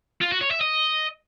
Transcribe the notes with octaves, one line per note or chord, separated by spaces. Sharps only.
F4
F#4
C#5
E5
D#5